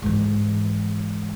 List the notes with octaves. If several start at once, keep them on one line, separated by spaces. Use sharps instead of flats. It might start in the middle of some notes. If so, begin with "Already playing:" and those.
G#2 E3